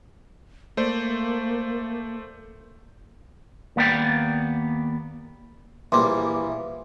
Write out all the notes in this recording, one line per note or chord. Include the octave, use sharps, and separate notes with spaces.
A3 A#3 C5 D5
D#2 A#3 B3 D5 G5
A#1 E3 G3 A#3 C6